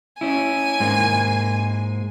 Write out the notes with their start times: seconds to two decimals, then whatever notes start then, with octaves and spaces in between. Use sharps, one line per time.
0.21 C#4 E4 G#5
0.80 G#2 G#3 A#3